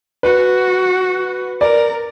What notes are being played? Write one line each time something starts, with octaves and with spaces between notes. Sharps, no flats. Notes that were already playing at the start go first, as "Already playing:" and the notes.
F#4 B4
A#4 D5